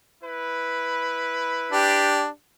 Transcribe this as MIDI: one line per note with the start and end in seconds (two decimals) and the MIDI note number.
0.21 2.16 64
0.21 2.16 71
1.72 2.26 62
1.72 2.26 67